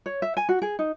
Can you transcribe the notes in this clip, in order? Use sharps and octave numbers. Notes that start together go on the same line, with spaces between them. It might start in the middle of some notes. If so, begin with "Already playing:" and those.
C#5
E5
G#5
F#4
G#4
D#4